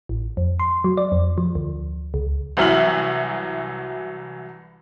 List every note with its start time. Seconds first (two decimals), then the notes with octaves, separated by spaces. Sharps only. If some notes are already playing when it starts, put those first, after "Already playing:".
0.09 A1
0.37 F2
0.60 C6
0.84 F#3
0.97 D5
1.12 F2
1.38 F3
1.55 D2
2.14 C#2
2.57 C2 E3 F#3 E5 F6 F#7